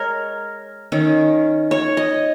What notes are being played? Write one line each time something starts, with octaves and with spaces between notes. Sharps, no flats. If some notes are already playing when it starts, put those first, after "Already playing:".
Already playing: G#3 A#4 C#5
D#3 C#4
C#5
D#5